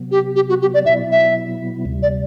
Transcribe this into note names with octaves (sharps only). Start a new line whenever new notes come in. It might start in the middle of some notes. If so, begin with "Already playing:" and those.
Already playing: C3 F#3 B3
G4
G4
F#4
G4
D5
B2 F#3 B3 E4 E5
E5
D2 C3 G3
D5